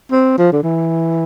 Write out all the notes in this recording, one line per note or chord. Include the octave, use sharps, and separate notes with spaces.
C4
F3
D3
E3